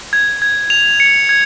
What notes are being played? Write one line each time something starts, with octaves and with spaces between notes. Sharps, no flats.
G#6
G#6
F7
C#7
G#6